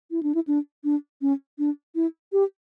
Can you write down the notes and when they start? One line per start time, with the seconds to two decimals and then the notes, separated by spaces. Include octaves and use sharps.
0.11 E4
0.23 D4
0.35 E4
0.48 D4
0.84 D4
1.22 C#4
1.58 D4
1.95 E4
2.33 G4